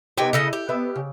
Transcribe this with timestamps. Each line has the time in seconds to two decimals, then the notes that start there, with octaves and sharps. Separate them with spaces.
0.18 C3 B3 D#4 G4 G5 G#5
0.33 C#3 E4 A4 D#5
0.53 G4
0.69 B3 E5
0.96 C#3